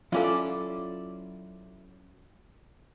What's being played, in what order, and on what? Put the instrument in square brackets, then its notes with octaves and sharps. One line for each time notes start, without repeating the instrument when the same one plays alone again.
[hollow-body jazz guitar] F#3 C#4 A5 [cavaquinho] E4 D5 D6 [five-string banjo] F4 A4